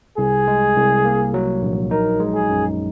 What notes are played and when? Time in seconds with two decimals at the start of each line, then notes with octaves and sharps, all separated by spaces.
0.17 C2 G#4
0.48 G#3
0.76 C2
1.05 A#3
1.34 F#3
1.62 A#1
1.91 D#4 A#4
2.20 G#3
2.35 G#4
2.50 F#2